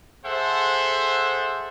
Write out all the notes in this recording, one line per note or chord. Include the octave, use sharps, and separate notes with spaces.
G#4 A4 C5 E5 F#5